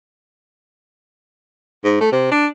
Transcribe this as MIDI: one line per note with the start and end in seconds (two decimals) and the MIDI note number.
1.84 1.97 44
2.01 2.12 57
2.12 2.28 48
2.31 2.46 62